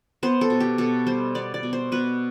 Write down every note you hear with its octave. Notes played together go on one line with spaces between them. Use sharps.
B3 C5
A4
B2
G4
B2 A4
G3 C5
B3 D5
D5
B2
C5
B2 B4